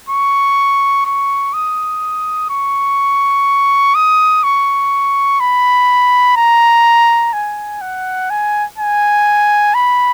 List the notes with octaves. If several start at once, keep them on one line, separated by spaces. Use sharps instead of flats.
C#6
C#6
D#6
C#6
D#6
C#6
B5
A#5
G#5
F#5
G#5
G#5
B5